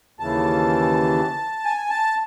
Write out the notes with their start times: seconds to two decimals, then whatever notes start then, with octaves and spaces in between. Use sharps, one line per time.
0.19 D#2 C#3 E3 A5
1.65 G#5
1.90 A5